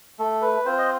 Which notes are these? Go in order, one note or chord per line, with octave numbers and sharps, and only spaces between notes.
A3 A4
B4
C4 F4 C5
D#5